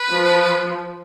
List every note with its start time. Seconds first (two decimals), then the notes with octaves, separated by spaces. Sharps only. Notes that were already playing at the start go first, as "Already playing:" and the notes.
Already playing: B4
0.10 F3